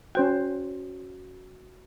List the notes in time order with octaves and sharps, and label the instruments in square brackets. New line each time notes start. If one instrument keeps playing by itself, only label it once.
[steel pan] C#4 C5 G5 [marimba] F#4